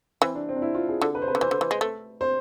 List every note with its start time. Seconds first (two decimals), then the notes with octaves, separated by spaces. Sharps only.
0.22 E3 C4
0.35 D4
0.49 C4
0.56 D4
0.62 E4
0.75 F4
0.89 G#4
1.01 D3 A4
1.15 B4
1.22 C5
1.28 B4
1.35 D3
1.41 E3 C5
1.51 D3
1.61 E3
1.71 G#3
1.81 A3
2.21 C5